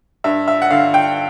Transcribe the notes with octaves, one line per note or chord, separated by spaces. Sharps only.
G2 E5
E5
F#5
D3 F5
G5